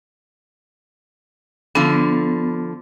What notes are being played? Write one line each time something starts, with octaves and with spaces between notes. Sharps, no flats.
D3 F3 B3